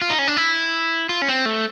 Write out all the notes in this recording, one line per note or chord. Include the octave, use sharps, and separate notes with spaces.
F4
D#4
C#4
D4
E4
F4
C#4
C4
A3